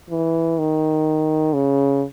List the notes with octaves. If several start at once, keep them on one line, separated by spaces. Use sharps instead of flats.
E3
D#3
C#3